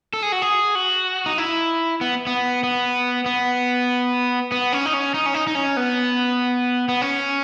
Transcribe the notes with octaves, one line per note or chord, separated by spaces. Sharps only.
A4
G#4
F#4
G#4
F#4
D#4
E4
B3
B3
B3
B3
B3
C#4
D#4
C#4
D#4
C#4
D#4
D#4
C#4
B3
B3
C#4